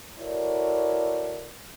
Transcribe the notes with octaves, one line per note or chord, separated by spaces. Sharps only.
E4 F#4 A4 A#4 C#5 D5